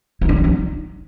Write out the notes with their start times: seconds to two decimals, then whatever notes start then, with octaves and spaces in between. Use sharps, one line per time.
0.21 E4
0.29 D4
0.36 F3
0.44 D#4